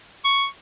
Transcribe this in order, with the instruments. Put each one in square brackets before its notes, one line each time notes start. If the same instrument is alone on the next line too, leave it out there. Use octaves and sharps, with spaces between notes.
[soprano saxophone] C#6